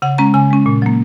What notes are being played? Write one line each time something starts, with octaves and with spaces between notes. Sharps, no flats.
C#3 F#5
G#3 C#4 A#5
C#3 G#5
G#3 C#4
A#2
F#3 A#3